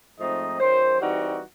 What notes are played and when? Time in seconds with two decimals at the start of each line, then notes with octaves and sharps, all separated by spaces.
0.19 G#2 F3 A3 C4 D#4 D#5
0.60 F#2 D#3 F#3 C5
1.01 E3 G3 C4 D#4 F#4